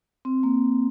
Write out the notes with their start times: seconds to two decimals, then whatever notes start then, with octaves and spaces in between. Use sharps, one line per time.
0.25 C4
0.43 A#3